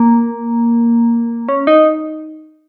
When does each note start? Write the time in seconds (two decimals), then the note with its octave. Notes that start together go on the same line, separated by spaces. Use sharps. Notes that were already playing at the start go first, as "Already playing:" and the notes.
Already playing: A#3
1.49 C#4
1.67 D#4